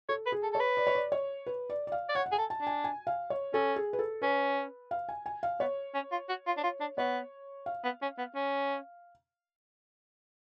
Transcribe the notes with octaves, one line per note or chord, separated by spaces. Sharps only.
A4 C#5
B4
G#4
A4
A4 C#5
B4
D5
C#5
D5
C#5
B4
D5
D5
F5
D5
C#5 F#5
F#5
G#4 G#5
A4
A5
D4
G#5
G#5
F5
C#5
C#4 A4
G#4
B4
A4
C#4 B4
F5
G#5
G#5
F5
B3 C#5
C#4
F4
F#4
F4
D4
F4
D4
B3 C#5
F5
B3
C#4
B3
C#4